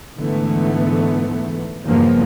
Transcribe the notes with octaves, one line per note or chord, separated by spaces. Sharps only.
G#2 D3 E3 A3 B3
E2 G2 C#3 F3 A#3 B3